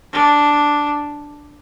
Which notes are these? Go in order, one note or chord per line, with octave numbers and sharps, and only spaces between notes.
D4